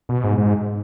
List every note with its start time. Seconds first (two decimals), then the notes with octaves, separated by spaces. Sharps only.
0.09 B2
0.24 G#2
0.38 G#2